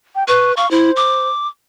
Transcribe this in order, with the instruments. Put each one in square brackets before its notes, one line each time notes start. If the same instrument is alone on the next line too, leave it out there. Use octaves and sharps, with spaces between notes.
[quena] G5
[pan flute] B4 [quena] C#6
[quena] F5 [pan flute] C#6
[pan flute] E4 [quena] C5
[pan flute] D6